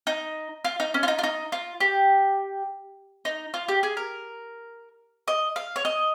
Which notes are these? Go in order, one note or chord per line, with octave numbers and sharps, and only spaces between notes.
D#4
F4
D#4
C#4
F4
D#4
F4
D#4
F4
G4
D#4
F4
G4
G#4
A#4
D#5
F5
C#5
D#5